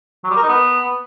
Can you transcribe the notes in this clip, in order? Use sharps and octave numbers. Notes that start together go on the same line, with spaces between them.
F#3
G3
A#4
D#4
B3